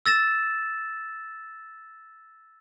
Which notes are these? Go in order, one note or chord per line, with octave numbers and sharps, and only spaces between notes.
E6 A6 A#6 E7